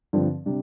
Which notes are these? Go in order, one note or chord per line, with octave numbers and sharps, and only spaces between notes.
G2 D3 F3 C4
C3 G3 D4